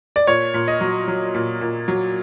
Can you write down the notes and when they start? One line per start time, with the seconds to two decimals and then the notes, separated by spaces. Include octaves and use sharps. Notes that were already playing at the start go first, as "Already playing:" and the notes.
0.16 D5
0.27 A#2 C#5
0.54 A#2
0.68 D#5
0.81 F#3
1.08 F#3
1.35 A#2
1.61 A#2
1.88 F#3